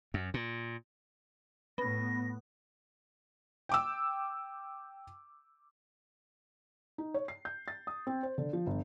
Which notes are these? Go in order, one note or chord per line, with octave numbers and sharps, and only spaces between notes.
F#2
A#2
A2 B3 A#6
G5 D6 E6
D#4
C#5
C7
G6
A6
D#6
C4
C5
D3
F3
G1